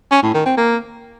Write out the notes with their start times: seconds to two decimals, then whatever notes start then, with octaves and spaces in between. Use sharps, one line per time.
0.11 C#4
0.23 A2
0.34 D#3
0.46 C4
0.57 A#3